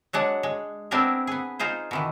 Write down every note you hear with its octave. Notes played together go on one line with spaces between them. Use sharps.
F#3 G#3 D4 F#5
G#3
B3 C4 D4 E4 G#4 A#4
B3 G#4
D#4 F4 G#4 C5
B2 D#3 E3